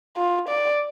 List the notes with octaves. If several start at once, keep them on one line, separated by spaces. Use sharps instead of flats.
F4
D5